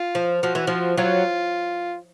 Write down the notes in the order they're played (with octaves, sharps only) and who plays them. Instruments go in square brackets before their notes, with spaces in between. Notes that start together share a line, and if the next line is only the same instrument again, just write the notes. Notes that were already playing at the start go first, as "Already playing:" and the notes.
Already playing: [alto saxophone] F4
[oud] F3
[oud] F3 [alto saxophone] F#4
[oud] E3
F3
[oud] F#3 [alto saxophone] F4